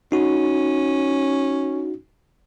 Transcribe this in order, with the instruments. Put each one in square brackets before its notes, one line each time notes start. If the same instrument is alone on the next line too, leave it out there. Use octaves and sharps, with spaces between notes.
[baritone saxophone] C#4 [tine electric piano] D#4 F#4